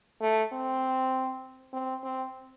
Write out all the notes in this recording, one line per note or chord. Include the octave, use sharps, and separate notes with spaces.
A3
C4
C4
C4